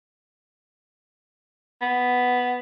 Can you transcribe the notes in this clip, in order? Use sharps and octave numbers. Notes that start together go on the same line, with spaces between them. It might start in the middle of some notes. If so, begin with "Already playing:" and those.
B3